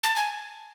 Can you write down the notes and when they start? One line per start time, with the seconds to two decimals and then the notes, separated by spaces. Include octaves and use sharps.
0.03 A5
0.16 G#5